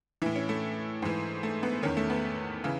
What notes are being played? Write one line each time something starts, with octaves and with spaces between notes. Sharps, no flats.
A2 E3 E4
C#4
A3
G#2 E3
A3
B3
E2 D#3 C#4
A3
B3
C#3 E3